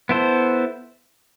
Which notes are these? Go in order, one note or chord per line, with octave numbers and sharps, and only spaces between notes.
B3 E4 A4 C5